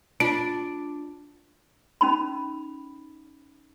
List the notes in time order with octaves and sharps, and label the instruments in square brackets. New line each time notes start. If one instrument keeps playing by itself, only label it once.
[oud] D4 [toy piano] F4 [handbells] D7
[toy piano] C#4 D#4 B5